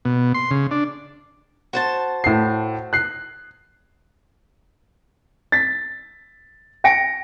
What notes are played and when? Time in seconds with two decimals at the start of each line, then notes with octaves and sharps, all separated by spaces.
0.05 B2
0.34 C6
0.51 C#3
0.71 D4
1.73 F#4 C5 A5
2.24 A2 C7
2.93 F#6 C7
5.52 A6 B6
6.84 G5 A#6 C#7 D7